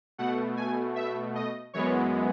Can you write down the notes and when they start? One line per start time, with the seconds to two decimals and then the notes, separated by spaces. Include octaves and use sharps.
0.18 B2 A3 F#5
0.57 G#5
0.96 E5
1.35 D#5
1.73 F#2 E3 G#3 B3 C#5